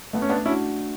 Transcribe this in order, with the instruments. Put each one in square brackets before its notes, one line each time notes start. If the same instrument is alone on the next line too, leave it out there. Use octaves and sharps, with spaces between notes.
[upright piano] A3 [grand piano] B3
[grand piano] C#4
B3 D4
[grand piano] C#4 E4 [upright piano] D4 F#4